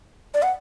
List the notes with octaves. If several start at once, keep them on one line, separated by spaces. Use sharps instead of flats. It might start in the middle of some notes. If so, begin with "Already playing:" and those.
D5
F#5